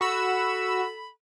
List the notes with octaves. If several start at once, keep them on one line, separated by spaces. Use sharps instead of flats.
F#4 A4 B5 E6